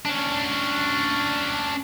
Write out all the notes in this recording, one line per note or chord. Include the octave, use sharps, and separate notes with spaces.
C#4 D4